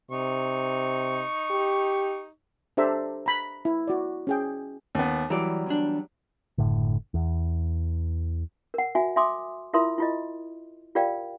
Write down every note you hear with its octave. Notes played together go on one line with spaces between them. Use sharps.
C3 D#4 C#6
G4
D4 G4 A4 C5 E5 A#5
A#5 B5
E4
F#4 D5
C#4 G#4 G5
D#2 B3
E3 F#3 G3 D5
E2 D4
F#1 B1 A2 D3
E2
A#4 F#5
F#4 E5 G#5
E5 G#5 C6 D6 D#6
E4 F4 A#4 E5 C6 D#6
E4 F4 D#5
F4 G4 A#4 D5 F5 G5